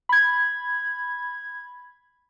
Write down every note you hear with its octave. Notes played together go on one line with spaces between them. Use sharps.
B5 G#6